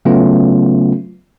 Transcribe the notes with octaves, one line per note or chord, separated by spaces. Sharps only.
C#3 F#3 A3 B3 C#4 F4